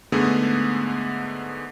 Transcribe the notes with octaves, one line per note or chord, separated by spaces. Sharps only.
G#2 D3 A3 B3 G#4